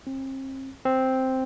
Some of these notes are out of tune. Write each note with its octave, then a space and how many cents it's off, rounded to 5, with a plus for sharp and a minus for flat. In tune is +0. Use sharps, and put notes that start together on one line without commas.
C4 +40
C4 +0